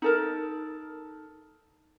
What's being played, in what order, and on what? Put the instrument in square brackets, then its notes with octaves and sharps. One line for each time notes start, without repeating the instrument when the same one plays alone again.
[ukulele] D#4 A4 A#4